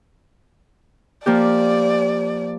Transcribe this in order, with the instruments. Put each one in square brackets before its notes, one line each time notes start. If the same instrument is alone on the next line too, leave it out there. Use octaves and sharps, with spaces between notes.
[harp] F3 A#3 G4 [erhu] D5